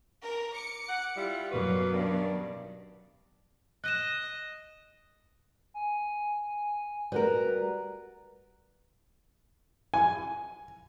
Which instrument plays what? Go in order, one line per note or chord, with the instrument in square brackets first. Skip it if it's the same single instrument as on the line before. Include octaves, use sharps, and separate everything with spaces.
[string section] A#4
D6 C#7
[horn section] F#5
G3 E4 F4
[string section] F#2 B2 F#3 [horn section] A#3 F#4 B4
[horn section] G2 D#3 D5
[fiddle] D#5 [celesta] F#6 D#7 E7
[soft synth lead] G#5
[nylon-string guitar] G3 F#4 A#4 [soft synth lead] B4
[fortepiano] G#5